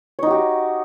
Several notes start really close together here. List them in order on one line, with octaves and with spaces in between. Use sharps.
C#5 D#4 F#4 G4